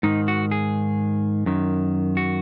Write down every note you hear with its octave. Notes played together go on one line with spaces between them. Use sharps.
G#2 D#3 D#4
F#4
G#4
F#2 D#3
F#4